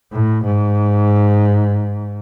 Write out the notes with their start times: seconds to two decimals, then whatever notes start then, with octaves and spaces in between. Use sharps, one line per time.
0.12 A2
0.45 G#2